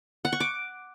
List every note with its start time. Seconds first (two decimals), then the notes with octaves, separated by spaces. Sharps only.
0.25 F#5
0.33 C#6
0.40 D6